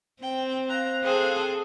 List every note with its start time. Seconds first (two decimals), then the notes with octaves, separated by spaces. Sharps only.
0.22 C4 G5
0.69 C5 F5 A#5 F#6
1.04 C4 G#4 A4